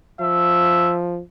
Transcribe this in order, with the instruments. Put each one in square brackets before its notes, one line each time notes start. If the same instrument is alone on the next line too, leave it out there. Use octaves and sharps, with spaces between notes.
[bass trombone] F3 [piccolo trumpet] E5